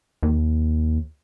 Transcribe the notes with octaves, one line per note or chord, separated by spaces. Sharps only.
D#2